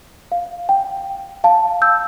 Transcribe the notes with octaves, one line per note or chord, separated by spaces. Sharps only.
F5
G5
F5 A5
E6 G6